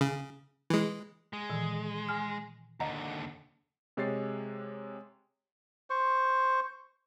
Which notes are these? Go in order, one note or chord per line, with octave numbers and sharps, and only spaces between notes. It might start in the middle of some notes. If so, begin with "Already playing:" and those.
C#3
E3 G#3
G#3
A#2 D#3 E3
G#5 F6
D#2 D3 D#5 F#5 A#5
C3 G#3 G4 C#5 A6 C7
C5 C#6